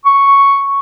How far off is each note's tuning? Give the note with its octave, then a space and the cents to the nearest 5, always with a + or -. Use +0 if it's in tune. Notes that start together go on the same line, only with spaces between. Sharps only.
C#6 +0